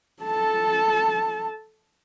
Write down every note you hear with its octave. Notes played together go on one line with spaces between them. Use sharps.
A4 A5